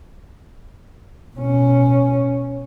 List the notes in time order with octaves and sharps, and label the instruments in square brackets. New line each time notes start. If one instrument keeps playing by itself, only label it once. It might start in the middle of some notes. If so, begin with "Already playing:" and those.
[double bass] B2 C#4